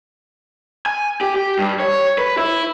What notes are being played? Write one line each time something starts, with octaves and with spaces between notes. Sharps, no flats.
G#5
G4
G4
G2
C#5
B4
E4